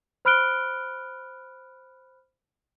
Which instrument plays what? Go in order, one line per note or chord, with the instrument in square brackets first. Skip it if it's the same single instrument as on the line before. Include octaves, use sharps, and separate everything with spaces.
[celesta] C5 B5 F6 F#6 D7 G7